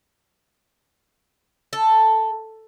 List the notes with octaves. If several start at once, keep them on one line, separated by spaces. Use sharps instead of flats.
A4